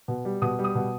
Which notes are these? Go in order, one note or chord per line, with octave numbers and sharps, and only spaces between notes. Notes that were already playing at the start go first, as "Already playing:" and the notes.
B2
G3
B2 D#6
G3
D#6
B2